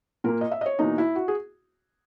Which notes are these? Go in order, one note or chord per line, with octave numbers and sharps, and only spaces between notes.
A#2 A#3 A#4
D#5
E5
D#5
C#5
E2 B2 A#3 D#4
E4
F#4
G#4